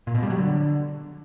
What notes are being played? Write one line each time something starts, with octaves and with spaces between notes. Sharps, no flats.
A#2
B2
G3
F#3
D3